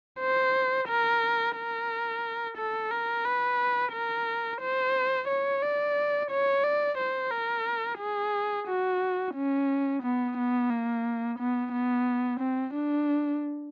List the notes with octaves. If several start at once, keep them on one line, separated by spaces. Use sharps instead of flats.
C5
A#4
A#4
A4
A#4
B4
A#4
C5
C#5
D5
C#5
D5
C5
A#4
G#4
F#4
C#4
B3
B3
A#3
B3
B3
C4
D4